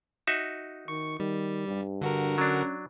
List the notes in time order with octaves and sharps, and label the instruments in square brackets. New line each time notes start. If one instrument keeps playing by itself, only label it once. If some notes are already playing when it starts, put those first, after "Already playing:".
[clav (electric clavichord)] D#4 F#4 E5
[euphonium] D#3 [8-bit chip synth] C#6
[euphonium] D#3 [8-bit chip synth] G3
[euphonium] G2
[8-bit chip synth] D3 F#4 A#4
[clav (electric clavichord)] F#3 D4 [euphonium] C#4